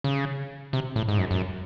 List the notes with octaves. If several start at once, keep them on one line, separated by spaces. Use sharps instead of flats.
C#3
C3
A2
G#2
F#2
F#2